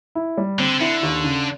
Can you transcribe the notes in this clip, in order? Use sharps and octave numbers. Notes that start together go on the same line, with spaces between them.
E4
G3
D3 C4
D3 E4
D#2
C#3